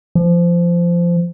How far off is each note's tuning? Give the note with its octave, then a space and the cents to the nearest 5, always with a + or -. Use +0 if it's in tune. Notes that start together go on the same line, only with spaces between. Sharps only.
F3 -20